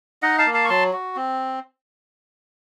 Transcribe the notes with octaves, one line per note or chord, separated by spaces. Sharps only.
D#4 D#5 F#5
F5 A5
A#3
F5 A5
C#6
F#3 A5 C6
F#4
C4